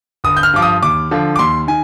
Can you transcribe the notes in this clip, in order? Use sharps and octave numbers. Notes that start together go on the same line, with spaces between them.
G1 D#6
G6
F6
G2 F3 D6
D#6
D#2 D6
D3 F3
D6
D#2 C6
D#3 G#5